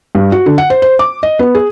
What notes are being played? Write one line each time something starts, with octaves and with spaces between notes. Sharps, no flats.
G2
F#4
D3
F#5
C5
C5
D6
D#5
B3
G#4